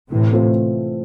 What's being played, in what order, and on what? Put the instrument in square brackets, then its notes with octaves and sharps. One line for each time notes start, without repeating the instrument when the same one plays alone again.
[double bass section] A2 C3 [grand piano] E3
[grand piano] A3 C4 F4